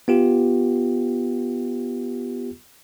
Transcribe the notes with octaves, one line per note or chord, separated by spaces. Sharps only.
B3 F4 G4